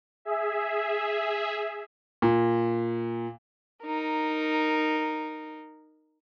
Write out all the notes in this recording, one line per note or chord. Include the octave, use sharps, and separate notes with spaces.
G#4 E5
A#2
D#4 A#4